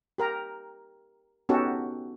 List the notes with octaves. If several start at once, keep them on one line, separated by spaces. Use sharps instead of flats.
G4 A#4 A#5
B3 C#4 D#4 F#4 G4 A4